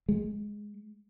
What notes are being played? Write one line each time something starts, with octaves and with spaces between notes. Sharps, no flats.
G#3